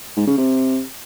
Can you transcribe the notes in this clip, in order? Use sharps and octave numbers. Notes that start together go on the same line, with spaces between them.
G#2
C#3
C3